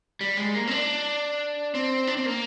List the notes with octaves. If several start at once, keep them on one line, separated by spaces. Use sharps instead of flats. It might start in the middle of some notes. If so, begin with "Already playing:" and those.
G3
G#3
A#3
C4
D4
C4
D4
C4
A#3